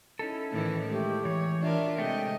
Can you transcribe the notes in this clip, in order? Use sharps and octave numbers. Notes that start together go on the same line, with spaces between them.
C#4 D#4 E4 A4
A2 D#3 E3
G#3 A3 G4
E3 C#5
D4 F4 A#4 E5
C3 G#3 A3 D#5 G5